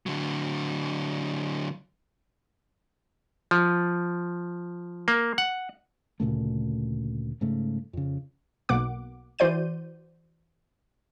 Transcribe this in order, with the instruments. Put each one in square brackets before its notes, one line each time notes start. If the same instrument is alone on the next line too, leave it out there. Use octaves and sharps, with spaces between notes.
[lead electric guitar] D3 F#3
[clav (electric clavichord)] F3
A#3
F#5
[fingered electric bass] D2 A#2 C#3 A3
G#2 C#3 A3
F2 C#3
[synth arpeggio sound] B1 B2 A#3 F#5 D6
E3 F#4 C5 D5 G6 D#7